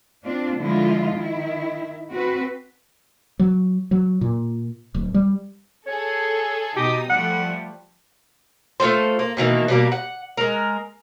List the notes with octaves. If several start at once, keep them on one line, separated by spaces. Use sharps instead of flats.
C4 D4 F4
D3 F3 G#3 E4 F4
D#3 E4
C4 F#4 B4
F#3
F#3
A#2
D1
G3
G#4 A4 C#5
B2 D#4 G4 D#6
F3 G3 A3 F#5
A3 F4 A4 C5
A#3
B2 D#3 E3 A#3
B2 G3 A#3
F#5
G#3 A#4